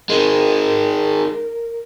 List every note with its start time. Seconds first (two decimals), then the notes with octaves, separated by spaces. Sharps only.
0.10 D#3 G#3 A#4